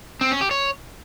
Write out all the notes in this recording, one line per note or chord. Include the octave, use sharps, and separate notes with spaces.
C4
C#4
G4
C#5